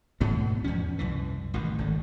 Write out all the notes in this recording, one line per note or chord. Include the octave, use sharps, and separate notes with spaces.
G#2 B2 E3 A3
E2 F3 C#4
C2 F#2 E3
A1 F#2 D#3
G#1 D3